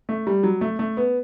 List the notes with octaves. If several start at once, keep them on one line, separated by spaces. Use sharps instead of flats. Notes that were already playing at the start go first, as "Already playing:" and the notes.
A3
G3
F#3
A3
A3
B3